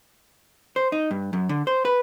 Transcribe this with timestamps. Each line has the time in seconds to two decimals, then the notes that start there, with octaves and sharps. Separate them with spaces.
0.76 C5
0.92 D#4
1.11 G2
1.33 F#2
1.49 D3
1.67 C5
1.85 B4